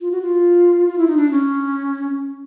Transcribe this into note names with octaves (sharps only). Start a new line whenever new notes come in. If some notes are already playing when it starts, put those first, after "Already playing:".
F4
F#4
F4
F4
E4
D#4
D4
C#4